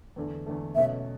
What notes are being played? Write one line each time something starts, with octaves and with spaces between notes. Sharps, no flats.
E2 D3 A3
E2 D3 A3
B1 B2 A3 C#4 E5